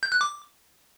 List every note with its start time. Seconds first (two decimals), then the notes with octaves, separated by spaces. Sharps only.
0.03 G6
0.12 F#6
0.21 D6